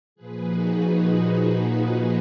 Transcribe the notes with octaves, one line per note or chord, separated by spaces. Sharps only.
A#2 F3 G#4 B4
D#4 F#4
D#4 F#4
D#4 F#4